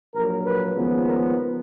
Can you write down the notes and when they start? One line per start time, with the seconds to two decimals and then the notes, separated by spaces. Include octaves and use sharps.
0.15 A#1 A#2 F#3 A#4
0.44 B4
0.75 D#2 C#3 F3 G#3 B3
1.06 A#4